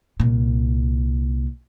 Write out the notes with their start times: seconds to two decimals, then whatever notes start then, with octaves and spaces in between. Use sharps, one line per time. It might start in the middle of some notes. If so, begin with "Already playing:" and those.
0.20 C2 A#2